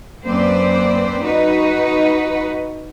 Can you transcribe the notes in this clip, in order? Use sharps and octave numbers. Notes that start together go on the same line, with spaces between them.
F#2 A#3 C4 B4 C5 D5
D#4 F#4 B4